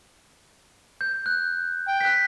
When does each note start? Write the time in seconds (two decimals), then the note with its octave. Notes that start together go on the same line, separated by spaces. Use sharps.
1.01 G6
1.26 F#6
1.88 G5
2.01 F#6 B6